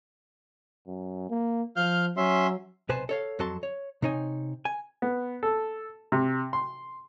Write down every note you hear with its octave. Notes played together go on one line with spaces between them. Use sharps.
F#2
A#3
F3 F5 F6 G6
F#3 C#4 E5 C6
B1 C3 B4 C5 G#5 A5
A4 C#5 F5
F2 F#3 F#4 A4 A5 C6
C#5
C3 C4 D#4 C#5 G#5
G#5
B3
A4
C3
C6